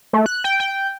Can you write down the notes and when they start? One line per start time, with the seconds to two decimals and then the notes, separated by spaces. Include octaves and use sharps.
0.13 A3
0.26 F#6
0.44 G5
0.60 G5